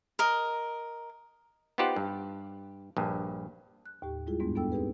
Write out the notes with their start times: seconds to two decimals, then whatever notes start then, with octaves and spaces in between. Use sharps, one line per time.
0.19 A#4 D#5
1.78 B3 D#4 F4 G4 C5 F#5
1.96 G2
2.97 A#1 G2
3.86 F#6
4.02 D#2 A2 G4
4.27 G3 G#3 E4 F4 G#4
4.40 F2 G#2 G3 G#3 B3 D4
4.55 B3 D4 A4 G5 E6
4.72 C4 D#4 G4 G#4 B4